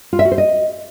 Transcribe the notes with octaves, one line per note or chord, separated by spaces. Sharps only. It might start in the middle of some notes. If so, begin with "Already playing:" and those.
F4
E5
F#4
C5
D#5